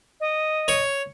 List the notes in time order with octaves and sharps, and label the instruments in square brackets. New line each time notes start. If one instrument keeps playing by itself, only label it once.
[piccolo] D#5
[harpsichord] C#5